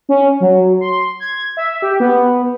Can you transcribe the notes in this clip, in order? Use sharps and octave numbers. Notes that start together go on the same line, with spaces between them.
C#4
F#3
C6
G#6
E5
G4
B3